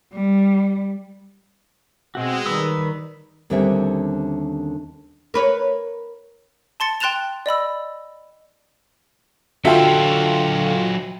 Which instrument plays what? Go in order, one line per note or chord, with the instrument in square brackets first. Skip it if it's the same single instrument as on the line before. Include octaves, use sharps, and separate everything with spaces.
[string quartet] G3
[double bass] B2 [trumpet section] G#3 [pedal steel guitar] C4 F#4
[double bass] D#3 G3 [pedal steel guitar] B4 D#6 E6
[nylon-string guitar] D#2 D3 G3 C4 C#4 E5
[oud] A#4 B4 C#5
[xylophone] A5 C6 A6 C#7
G5 C6 F#6 A6 E7 F7
D5 D#5 B5 E6
[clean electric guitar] D3 [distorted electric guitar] F#3 A4 [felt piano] F4 F#4 [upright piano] E5 G5